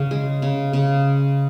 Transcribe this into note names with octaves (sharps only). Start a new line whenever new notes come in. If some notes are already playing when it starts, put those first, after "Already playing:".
Already playing: C#3 C#4
G#3
C#3
C#3